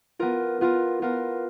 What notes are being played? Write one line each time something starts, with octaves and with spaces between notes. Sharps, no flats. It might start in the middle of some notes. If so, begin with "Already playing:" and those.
B3 F4 A#4
B3 F4 A#4
B3 F4 A#4